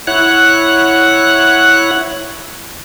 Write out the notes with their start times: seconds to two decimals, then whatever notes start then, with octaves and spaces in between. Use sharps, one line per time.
0.07 E4 C#5 F#5 F#6